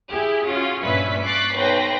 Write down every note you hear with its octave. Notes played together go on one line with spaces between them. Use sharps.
E4 G4 G#4
C#4 F4 F#4
G2 A#2 C#4 B4 E5 B6
C#6 D6 F#6 A6 B6 C7
B1 B4 C5 G5 A#6 C7